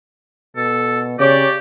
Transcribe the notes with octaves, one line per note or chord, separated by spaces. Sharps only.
B2 A4
C#3 G4 C#5 D5